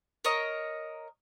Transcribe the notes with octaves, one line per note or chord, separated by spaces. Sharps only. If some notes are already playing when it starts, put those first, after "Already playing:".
A#4 C#5 D#5